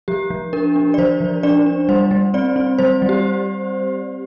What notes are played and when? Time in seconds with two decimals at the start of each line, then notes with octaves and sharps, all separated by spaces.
0.08 F3 G4
0.30 F3
0.53 D4 A#4
0.76 D4
0.94 D5
0.98 F3 C5
1.21 F3
1.43 D4 D5
1.66 D4
1.89 G3 C5
2.11 G3
2.34 C4 D5
2.56 C4
2.79 G3 C5
3.02 G3
3.09 G4